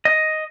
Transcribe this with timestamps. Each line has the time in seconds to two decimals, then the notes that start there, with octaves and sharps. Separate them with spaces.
0.05 D#5